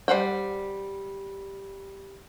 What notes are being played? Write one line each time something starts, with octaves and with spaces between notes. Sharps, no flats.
G3 C5 F#5 G5